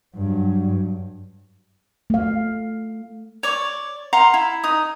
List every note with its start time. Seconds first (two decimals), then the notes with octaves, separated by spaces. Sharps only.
0.16 G2 F#3
2.10 A3 F5
3.43 C#5 D5 C#6
4.13 F5 F#5 A#5 C6
4.34 E4
4.64 D#4 D#6